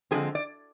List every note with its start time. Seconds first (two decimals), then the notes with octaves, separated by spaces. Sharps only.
0.11 D3 F3 G#3 C4 G#4
0.35 D5